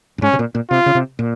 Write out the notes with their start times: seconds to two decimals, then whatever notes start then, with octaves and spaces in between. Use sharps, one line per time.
0.18 G2
0.22 G#2 C#4
0.33 C3
0.39 A#2
0.55 A#2
0.70 C3 F4
0.86 C#3
0.95 C3
1.19 A#2